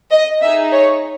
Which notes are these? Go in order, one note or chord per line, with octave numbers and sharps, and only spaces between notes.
D#5
D#4 G#4 E5
C#5